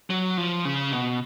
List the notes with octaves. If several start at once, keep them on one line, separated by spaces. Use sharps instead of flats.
F#3
F3
C#3
B2